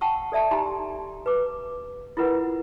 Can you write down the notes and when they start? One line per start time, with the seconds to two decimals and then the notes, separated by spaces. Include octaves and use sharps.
0.01 F#5 G5 A5 C#6 E6
0.32 A4 D5 E5 A5
0.51 D#4 G4 G#5 A#5 C6
1.26 B4 D6
2.17 E4 F4 A#4 B4 F#5